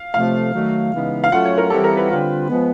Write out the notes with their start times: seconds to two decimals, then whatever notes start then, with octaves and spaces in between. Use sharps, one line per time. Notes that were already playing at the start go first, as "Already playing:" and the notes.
Already playing: F5
0.14 C3 F3 A3 F5
0.53 D#3 F#3 A3
0.92 C#3 E3 G#3 B3 D#4
1.24 F5
1.31 F#3 A3 C#4 F4 F#5
1.45 C#5
1.58 A#4
1.70 E3 G3 C4 E4 G4 A4
1.84 A#4
1.97 B4
2.10 D3 G3 C4 F4
2.49 F3 G#3 B3